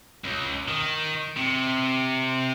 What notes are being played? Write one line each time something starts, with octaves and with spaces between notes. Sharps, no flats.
C#2
D#3
C3